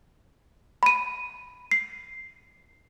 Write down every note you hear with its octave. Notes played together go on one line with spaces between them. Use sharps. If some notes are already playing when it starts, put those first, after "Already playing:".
B5 D#7
C7